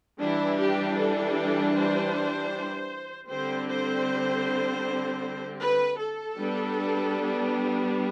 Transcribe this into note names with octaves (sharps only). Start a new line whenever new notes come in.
E3 G3 D4 E4
G4
A4
C5
D3 G3 C4 C5
C5
B4
A4
G3 B3 D4